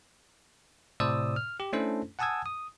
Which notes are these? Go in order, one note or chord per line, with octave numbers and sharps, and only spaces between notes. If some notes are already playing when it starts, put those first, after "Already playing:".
A2 C3 C5 D5 D#6 E6
F6
G4
A3 C#4 D4 E4 A4 C5
F#5 G#5 A5 D#6 E6 G#6
D#6